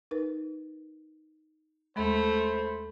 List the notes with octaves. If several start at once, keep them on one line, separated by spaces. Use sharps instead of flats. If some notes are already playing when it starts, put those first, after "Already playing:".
D#4 A#4 B4
D#2 G#3 A3 C5 B5